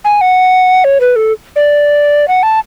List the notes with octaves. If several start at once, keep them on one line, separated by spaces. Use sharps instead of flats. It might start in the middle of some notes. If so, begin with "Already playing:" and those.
G#5
F#5
C#5
B4
A4
D5
F#5
A5